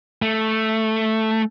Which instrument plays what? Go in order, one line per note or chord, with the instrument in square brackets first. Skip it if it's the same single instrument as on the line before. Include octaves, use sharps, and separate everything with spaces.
[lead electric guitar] A3